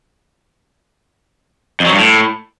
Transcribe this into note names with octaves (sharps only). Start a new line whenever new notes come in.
F2
F#3
G2
A2